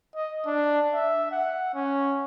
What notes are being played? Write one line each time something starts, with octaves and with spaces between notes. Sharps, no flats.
D#5
D4
E5
F#5
C#4